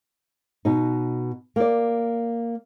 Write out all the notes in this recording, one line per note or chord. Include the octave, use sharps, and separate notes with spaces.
B2 D#4
A#3 D5